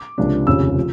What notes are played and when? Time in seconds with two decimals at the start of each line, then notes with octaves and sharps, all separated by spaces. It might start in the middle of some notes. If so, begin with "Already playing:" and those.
Already playing: D6
0.18 C#2 C3 F3 A#3 D4
0.46 F1 D#2 C#3 F3 E6
0.76 F3